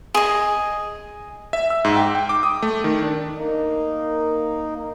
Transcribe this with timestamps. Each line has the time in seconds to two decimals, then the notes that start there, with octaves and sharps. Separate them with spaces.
0.15 G#4 D#5
1.53 E5
1.70 E6
1.84 G#2
1.96 G5
2.15 G5
2.29 D6
2.43 D#6
2.62 A3
2.84 D#3
3.02 D4
3.35 A#3 D#4